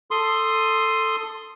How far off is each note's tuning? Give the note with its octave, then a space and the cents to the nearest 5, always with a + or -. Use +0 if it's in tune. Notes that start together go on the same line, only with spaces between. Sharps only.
A4 +10 C6 +0 D#6 +0